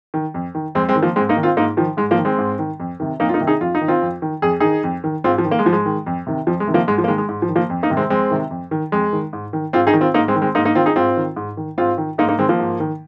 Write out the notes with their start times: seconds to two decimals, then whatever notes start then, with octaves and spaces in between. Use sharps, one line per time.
0.14 D#3
0.34 F2
0.55 D#3
0.75 F2 G#3 C4
0.89 G#3 C4
0.96 D#3
1.02 F3 A#3
1.16 G#2 G#3 C4
1.29 A#3 D#4
1.37 D#3
1.43 C4 F4
1.57 G#2 A#3 D#4
1.77 D#3 F3
1.97 G#2 G#3
2.11 F3 A#3
2.18 D#3
2.25 G#3 C4
2.38 G#2
2.59 D#3
2.80 F2
3.00 C3 D#3
3.20 F2 A#3 D#4
3.29 F4
3.34 A#3 D#4
3.40 C3 D#3
3.47 D#4 G#4
3.61 F2 F4
3.75 D#4
3.81 D#3
3.88 C4 F4
4.02 F2
4.22 D#3
4.42 F2 G#4
4.60 D#3 D#4 G#4
4.84 F2
5.04 D#3
5.24 G#2 C4 F4
5.38 F3
5.45 D#3
5.51 A#3
5.59 G#3
5.65 G#2 F3
5.73 G#3
5.86 D#3
6.06 F2
6.27 C3 D#3
6.47 F2 F3
6.60 G#3
6.67 C3 D#3
6.74 F3 A#3
6.88 G#2 G#3
6.98 F3
7.04 A#3
7.08 D#3 G#3
7.18 G#3
7.29 G#2
7.42 F3
7.49 D#3
7.56 F3 A#3
7.70 F2
7.83 A#3 D#4
7.90 C3 D#3
7.97 G#3 C4
8.10 F2 G#3 C4
8.31 C3 D#3
8.51 F2
8.71 D#3
8.92 F2 G#3
9.13 D#3
9.33 G#2
9.53 D#3
9.73 G#2 C4 F4
9.87 D#4 G#4
9.93 D#3
10.01 C4 F4
10.14 G#2 A#3 D#4
10.28 G#3 C4
10.35 D#3
10.42 G#3 C4
10.55 G#2 A#3 D#4
10.65 A#3 D#4
10.75 D#3 C4 F4
10.86 D#4 G#4
10.96 G#2 C4 F4
11.17 D#3
11.36 G#2
11.57 D#3
11.78 G#2 C4 F4
11.98 D#3
12.18 G#2 A#3 D#4
12.29 A#3 D#4
12.39 D#3 G#3 C4
12.49 F3 A#3
12.59 G#2
12.80 D#3